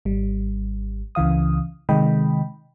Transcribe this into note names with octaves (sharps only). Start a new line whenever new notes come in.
G#1 G3
C#2 C#3 E3 F5 D#6
C3 D#3 G#3 D#5 G5 B5